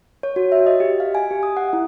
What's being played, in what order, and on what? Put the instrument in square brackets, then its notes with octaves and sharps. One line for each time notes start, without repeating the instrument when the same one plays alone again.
[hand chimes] C#5
F#4
E5
D#5
G4
F5
G#5
G4
D#6
F#5
E4